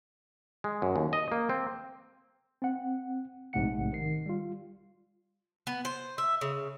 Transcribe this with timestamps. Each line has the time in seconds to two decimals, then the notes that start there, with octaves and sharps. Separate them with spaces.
0.64 G#3
0.82 F#2
0.96 D#2
1.13 D#5
1.32 A#3
1.49 C4
2.62 C4 F#5
3.53 A#1 G#2 C3 A3 F#5 C#7
3.93 D#3 C7
4.26 G3 F4
5.67 B3
5.85 C5
6.18 E5
6.41 C#3